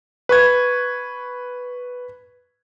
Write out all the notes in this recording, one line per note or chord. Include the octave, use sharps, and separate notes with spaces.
B4 C#6 G#6